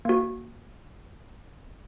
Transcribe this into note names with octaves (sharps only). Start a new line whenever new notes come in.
A#3 F#4